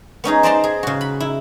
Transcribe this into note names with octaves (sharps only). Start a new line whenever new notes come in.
B3 C#4 D#4 G#4
C5 D5 D#5 A5 A#5 C6
G#4
C#3 F#4
B5
E4